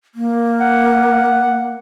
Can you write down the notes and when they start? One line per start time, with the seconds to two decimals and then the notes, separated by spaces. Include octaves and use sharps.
0.15 A#3
0.61 F#5